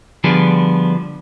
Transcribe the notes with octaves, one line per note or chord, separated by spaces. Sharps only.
D3 F3 G3 B3 G#4